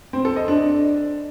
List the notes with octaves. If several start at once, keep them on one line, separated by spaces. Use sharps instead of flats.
C4
A4
D#5
D4